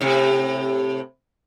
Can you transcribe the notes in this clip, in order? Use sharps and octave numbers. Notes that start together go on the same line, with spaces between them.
A2 C3